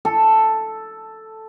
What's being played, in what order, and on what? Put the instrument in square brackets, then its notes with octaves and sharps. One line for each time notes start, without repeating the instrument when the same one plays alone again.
[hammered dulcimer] A4